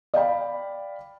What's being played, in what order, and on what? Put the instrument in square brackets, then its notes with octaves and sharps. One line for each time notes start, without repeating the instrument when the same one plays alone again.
[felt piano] D5 F5 G5 B5